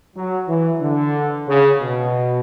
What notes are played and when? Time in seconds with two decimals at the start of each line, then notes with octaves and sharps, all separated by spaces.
0.17 F#3
0.48 E3
0.81 D3
1.47 C#3
1.81 B2